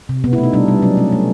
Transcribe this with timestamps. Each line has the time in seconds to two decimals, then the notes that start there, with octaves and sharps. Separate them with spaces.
0.09 C3
0.24 B2 B3
0.33 E4
0.38 A3
0.43 D#4
0.53 G3 D4
0.68 G3
0.82 F#3 C#4
0.97 A3 C#4
1.12 A3